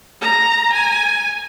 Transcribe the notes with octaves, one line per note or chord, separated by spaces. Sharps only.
A#5
G#5